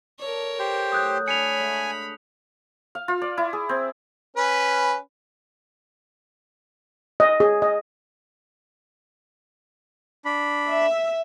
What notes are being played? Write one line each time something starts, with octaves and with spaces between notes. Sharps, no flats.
A4 A#4 C#5 D5
G4 C5
A2 F#3 D#6 F#6 G6
D4 G4 C#5 G#5 B5 C#7 F7
D3 G#3 A3
F5
F4
D5
E4
G#4
C4
C#4 B4
D#5
G#4
D#5
D4 B5
E5